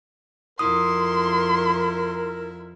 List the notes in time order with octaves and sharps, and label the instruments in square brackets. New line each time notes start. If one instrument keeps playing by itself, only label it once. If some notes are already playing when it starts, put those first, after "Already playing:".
[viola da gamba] F2 E4 [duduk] A#4 [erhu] C6 [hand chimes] D#6